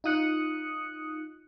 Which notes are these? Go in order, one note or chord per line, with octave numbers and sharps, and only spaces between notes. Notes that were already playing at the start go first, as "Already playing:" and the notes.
D#4 F4 D#6 F#6 C#7